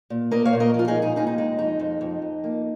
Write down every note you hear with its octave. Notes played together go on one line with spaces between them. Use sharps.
A#2
A#3 A#4 D#5
C#5 F5
A#2
A#4 D#5
F3
F4
D#4 G#4
G#2
D#4 G#4
D#2 D#4 G#4
D#4
G#3 D#4
F2 D#4
F2
F2
F2
A#3